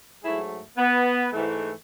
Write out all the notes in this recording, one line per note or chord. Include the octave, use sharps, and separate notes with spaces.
G#2 F#3 A3 E4 G#4
B3
G#2 E3 A3